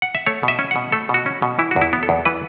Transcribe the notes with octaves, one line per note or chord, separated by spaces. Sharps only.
F#5
E5
A3 C#5
B2 E5
C#4
B2 F#5
A3 A4
B2 F#4
C#4
B2
E3 E4
F#4
E2
E4
B3
A4
E2
E3 B4